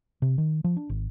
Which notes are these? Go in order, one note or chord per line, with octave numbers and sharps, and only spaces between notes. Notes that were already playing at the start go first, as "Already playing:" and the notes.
C3
D#3
F3
D4
G#1